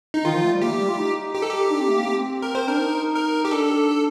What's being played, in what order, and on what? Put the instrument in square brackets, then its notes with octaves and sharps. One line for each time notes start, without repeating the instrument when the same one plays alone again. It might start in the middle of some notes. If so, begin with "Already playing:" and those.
[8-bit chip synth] D#4
[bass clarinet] D#3 [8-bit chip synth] F4
[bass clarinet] F3
A3
G3
[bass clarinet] A#3 [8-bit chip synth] G4
[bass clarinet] A3
G3
F4
D#4
[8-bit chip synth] G4
A4
G4
[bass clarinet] D4
C4
A3
A#3
C4
[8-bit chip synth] A#4
C5
[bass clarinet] D4 [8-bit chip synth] A#4
[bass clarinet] D#4
[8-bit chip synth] A#4
G4
[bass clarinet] D4 [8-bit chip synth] A4